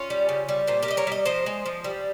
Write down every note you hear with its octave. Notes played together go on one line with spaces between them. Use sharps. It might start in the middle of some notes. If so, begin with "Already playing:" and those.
Already playing: C#4 F4
G3
C#3
G3
A#2 C4
G4 A#4
G3 D#5
A#4 C#5
G3 D#5
F3 C5 D#5
G#3
F3
G3